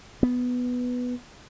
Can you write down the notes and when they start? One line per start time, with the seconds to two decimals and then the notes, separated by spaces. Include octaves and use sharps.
0.23 B3